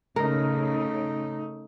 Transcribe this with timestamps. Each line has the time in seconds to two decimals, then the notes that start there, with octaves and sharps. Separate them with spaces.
0.16 C#3 A3 D#4 A#4